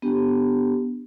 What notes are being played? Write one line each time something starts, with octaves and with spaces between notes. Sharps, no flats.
B3 D4 G4